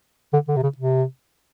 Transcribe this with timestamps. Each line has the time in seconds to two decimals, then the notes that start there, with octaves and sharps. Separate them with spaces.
0.33 D3
0.48 D3
0.56 C3
0.63 C#3
0.77 C3